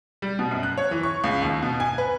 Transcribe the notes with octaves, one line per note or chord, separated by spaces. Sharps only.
G3
B2
F#2
F#6
C#5
E3
C#6
C#2
D#2
B2
G#5
B4